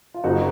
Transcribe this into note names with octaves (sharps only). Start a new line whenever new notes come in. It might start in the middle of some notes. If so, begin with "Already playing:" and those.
F4
F#1 D#4 F#4